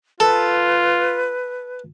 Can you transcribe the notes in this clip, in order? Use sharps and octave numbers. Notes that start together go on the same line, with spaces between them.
F4 A4 B4